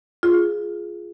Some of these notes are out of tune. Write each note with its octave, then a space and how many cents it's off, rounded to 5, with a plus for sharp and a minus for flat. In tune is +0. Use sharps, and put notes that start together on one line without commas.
F4 +0 G#4 +5